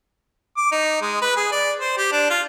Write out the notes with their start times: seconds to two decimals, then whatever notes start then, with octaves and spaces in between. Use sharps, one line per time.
0.57 D6
0.72 D#4
1.02 G#3
1.22 B4
1.36 G#4
1.52 D5
1.81 C5
1.98 G4
2.12 D4
2.30 F4